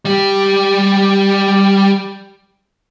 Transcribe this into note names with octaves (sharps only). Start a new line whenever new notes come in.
G3 G4